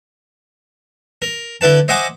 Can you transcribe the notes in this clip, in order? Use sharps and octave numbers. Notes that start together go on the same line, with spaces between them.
A#4
D3 E4 B4 A5
C5 D#5 E5 F#5 G#5 D6